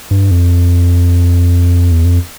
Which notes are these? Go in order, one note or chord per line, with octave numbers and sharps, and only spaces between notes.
G2
F2
E2
F2